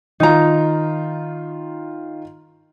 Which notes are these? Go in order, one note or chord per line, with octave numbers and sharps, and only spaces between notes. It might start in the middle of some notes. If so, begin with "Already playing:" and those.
D#3 D#4 F4 A#5